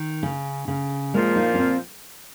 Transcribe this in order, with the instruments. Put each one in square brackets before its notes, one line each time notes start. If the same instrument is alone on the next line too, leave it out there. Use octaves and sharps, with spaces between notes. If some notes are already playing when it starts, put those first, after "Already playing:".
Already playing: [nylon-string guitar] D#3
C#3
C#3
[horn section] A#2 F3 A#3 F4 [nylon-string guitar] G#3
[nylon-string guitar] D#4
C#4
C4